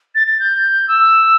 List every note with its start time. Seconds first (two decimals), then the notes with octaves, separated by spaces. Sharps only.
0.15 A6
0.27 A6
0.40 G6
0.88 E6